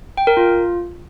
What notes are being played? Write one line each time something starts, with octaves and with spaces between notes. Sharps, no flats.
G5
A#4
F4